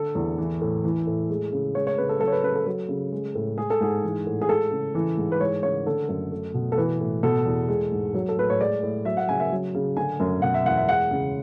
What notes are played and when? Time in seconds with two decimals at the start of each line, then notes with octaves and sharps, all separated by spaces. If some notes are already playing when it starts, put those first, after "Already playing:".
Already playing: D3 A4
0.15 E2
0.38 E3
0.61 A2
0.84 E3
1.07 A2
1.30 G#3
1.52 C#3
1.75 G#3 C#5
1.87 C#5
1.98 C#3 B4
2.09 A4
2.20 F#3 A4
2.27 C#5
2.32 B4
2.44 C#3 B4
2.55 A4
2.66 F#3 A4
2.89 C#3
3.12 G#3
3.35 A2
3.58 G#3 G#4
3.70 A4
3.81 G#2 G#4
4.04 E3
4.27 A2
4.41 G#4
4.49 G#3 A4
4.71 C#3
4.95 E3
5.17 G#2
5.32 B4
5.40 G#3 C#5
5.63 C#3 C#5
5.86 D3 A4
6.09 F#2 A4
6.31 A3
6.54 B2
6.72 A4
6.77 E3 B4
7.00 A2
7.23 B2 A4
7.46 E2
7.69 G#3
7.92 G#2
8.14 F#3
8.29 A4
8.37 A2 B4
8.50 C#5
8.60 G#3 D5
8.83 A2
9.05 F#3 E5
9.17 F#5
9.29 C#3 G#5
9.40 E5
9.52 F#3
9.75 C#3
9.96 D3 G#5
10.20 F#2
10.42 B2 F#5
10.54 E5
10.65 E2 F#5
10.77 E5
10.88 G#3 F#5
11.11 C#3